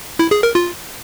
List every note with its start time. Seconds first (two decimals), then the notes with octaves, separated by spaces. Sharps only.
0.19 E4
0.31 G#4
0.43 A#4
0.55 F4